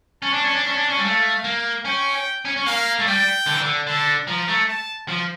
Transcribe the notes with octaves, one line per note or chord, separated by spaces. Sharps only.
C#4 A5
D4
C#4
D4
C#4
D4
C#4
G3
A3 F5
A#3
C#4 G5
C#4
C#4
A#3 F5
A3
G3 G5
D3
E3
D3
D3 A5
F3 A#5
A3
A5
F3